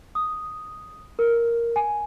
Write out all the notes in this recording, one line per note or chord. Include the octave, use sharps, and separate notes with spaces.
D#6
A#4
G#5